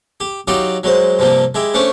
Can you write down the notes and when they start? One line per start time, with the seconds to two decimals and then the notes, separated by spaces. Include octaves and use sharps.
0.20 G4
0.48 F#3 D#4 F4 G4 D5
0.84 F#3 G#3 C5
1.19 G2 C3 F3 G3 A#3
1.55 G#3 E4 G4
1.74 A3 C#4 D4 C5